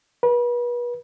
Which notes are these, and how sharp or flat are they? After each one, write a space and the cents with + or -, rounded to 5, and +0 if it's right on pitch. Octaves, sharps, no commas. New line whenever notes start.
B4 -35